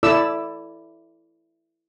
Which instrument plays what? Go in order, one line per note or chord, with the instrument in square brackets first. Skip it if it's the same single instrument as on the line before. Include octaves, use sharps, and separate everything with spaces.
[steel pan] E4 A4 D5 E6